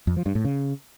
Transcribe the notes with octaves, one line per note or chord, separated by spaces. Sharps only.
F2
F3
G2
A2
C#3